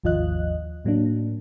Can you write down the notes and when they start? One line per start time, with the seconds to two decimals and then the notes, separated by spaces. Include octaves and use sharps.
0.04 G#1 D#2 F3 F4 D#5 F#6
0.84 A2 F#3 A#3 D4